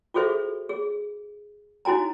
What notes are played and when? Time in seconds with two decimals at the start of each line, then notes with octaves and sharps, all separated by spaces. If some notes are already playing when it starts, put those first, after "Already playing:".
0.14 F4 F#4 G#4 A4 C5 E5
0.69 G#4
1.85 D#4 E4 F#4 G#5 A#5